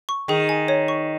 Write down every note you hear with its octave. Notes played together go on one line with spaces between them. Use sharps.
C#6
D#3 G#4
G#5
C#5
C#6